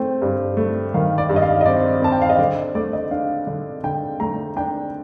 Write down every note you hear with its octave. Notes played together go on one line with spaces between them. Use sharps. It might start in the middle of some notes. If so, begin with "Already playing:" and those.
Already playing: A3 C4 G5
G2
A3
D#3 F5
D5
G2
D#5
F5
D#5
C4 D5
C4 A5
G5
F5
D#5
D3 D5
A3 D5
D#5
D4 F5
D3
D3 G5
A3 A#5
D4 G5